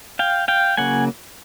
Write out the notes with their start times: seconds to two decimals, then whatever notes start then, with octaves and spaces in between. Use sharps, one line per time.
0.19 F5 G5
0.48 F5 G5
0.77 C#3 F#3 A#3 F#5 G#5